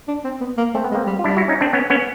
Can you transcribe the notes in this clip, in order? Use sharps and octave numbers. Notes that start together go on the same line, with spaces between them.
D4
C4
B3
A#3
A3 C4
B3
G#3
A#3 C4
G3
F4
G3 D4 E4
E4 F#4
C#4 D#4
C4 D4
B3 C#4
B3 C#4